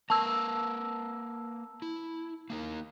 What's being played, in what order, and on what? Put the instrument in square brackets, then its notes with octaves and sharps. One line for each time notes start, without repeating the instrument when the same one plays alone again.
[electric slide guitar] A#3 A#4 B4 [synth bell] A5 E6
[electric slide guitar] E4
A#3 D#4 A#4